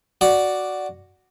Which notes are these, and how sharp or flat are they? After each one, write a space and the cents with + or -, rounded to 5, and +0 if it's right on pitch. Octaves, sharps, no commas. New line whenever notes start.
F#4 +0 D5 +0